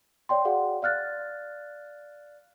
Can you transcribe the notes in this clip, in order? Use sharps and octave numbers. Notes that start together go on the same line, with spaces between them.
C#5 D5 G5 C6
F#4 G#4 D5 F5 F#5
D5 F5 F6 F#6 A6